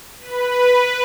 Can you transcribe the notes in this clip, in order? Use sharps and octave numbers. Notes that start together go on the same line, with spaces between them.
B4